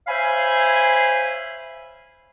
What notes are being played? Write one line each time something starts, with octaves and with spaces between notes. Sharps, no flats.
C5 C#5 E5 F5 G#5 B5